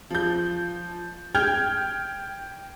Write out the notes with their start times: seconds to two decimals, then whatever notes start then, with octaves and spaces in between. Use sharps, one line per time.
0.10 F3 G6
1.35 G5 F6 G6 G#6